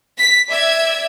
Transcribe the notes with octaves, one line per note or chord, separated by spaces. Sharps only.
B6
D5 E5 G#6